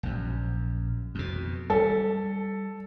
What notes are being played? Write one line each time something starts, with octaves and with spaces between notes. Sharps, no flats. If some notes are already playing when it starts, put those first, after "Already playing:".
A#1 F#2
F2 B2
G3 A4